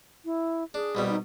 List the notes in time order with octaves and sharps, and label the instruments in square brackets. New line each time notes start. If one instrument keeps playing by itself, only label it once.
[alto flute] E4
[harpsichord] D4 [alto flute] G#4
[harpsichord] C2 B2 G3
[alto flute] D#4